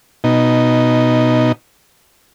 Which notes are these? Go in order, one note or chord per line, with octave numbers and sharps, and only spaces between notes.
B2 D#4